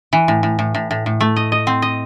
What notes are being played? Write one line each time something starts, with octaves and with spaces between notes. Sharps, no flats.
E3
A2
A2
A2
A2
A2
A2
A3
D#5
D#5
C4
D#5